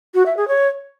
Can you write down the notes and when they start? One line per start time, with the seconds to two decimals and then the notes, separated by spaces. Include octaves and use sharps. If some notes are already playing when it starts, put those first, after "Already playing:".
0.14 F#4
0.26 E5
0.37 G#4
0.48 C#5